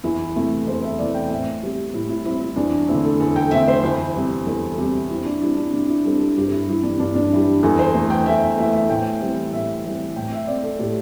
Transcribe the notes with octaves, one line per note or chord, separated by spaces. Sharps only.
E2 E4
C3 E3 A3
E2 C5
E5
C3 E3 A3 D5
G5
A2 E5
G3 C4 G4
A2 E4
E4
G3 C4 E4
E4
E2 D4
D3 A3 C4 E4
A4
E2 A4
G5
D3 A3 C4 E5
C5
E2 E4
C3 G3 C4
E2 A4
C3 G3 C4 G4
C3 E4
D4
G3 C4 E4
D4
C3 D4
E4
G3 C4 A4
A4
G2 G4
E4
E3 G3 E4
D4
G2 D4
D4
E3 G3 E4
E2 A4
C5
E3 A3
G5
E2 E5
E5
E3 A3 E5
E5
A2 G5
E3 G3 C4
A2 E5
E3 G3 C4
A2 G5
E5
A3 C4 D5
A4
A2 G4